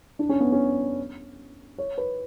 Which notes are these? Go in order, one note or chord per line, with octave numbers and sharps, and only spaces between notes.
D4
C#4
B3
C#4
C#5
B4